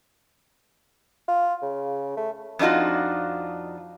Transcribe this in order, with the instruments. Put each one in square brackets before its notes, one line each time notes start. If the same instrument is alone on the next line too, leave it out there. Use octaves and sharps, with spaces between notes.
[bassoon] F4
C#3
A3
[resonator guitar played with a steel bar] F2 D4 D#4 F4 F#4